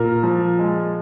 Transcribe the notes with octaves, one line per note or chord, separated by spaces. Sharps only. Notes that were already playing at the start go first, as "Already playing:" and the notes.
Already playing: A#2 A#4
F3
G#3